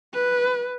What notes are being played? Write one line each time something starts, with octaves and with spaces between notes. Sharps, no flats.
B4